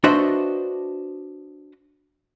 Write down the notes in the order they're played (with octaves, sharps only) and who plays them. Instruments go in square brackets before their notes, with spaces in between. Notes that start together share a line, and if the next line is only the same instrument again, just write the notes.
[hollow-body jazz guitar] D4 F#4 B4 C5 D#5 E5